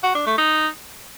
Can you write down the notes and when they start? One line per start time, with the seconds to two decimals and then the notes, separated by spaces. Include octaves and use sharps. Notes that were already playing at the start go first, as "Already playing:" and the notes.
0.03 F#4
0.15 D4
0.26 A3
0.38 D#4